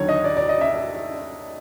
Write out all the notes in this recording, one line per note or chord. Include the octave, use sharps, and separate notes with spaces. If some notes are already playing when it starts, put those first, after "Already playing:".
Already playing: D#2 D3 F#3 C#5
D#5
D5
D5
D#5
E5